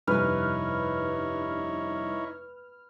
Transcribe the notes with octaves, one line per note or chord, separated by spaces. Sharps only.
F1 G2 D#4 E4 B4 C#5 F6